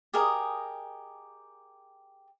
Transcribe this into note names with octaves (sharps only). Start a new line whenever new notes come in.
G4 G#4 A#4 D#5